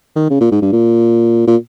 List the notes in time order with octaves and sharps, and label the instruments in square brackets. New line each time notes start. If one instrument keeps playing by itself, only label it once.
[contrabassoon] D#3
C#3
A#2
G#2
G2
A#2
A#2